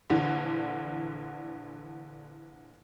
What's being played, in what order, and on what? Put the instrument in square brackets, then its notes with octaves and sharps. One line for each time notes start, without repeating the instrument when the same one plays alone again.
[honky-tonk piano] A#1 D3 E3